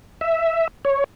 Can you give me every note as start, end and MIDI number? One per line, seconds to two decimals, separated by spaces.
0.21 0.67 76
0.85 1.04 73